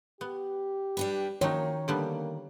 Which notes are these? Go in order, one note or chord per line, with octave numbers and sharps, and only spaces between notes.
B3 G4
G3 D4 B4
D#3 F3 F#3 A#3 D#4 C#5
D3 G3 A#3 B3